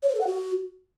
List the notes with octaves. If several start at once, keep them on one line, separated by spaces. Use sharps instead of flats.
C#5
C5
A4
F#5
F#4